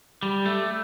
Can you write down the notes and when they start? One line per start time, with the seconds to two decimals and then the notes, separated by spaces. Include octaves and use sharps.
0.23 G3
0.46 A3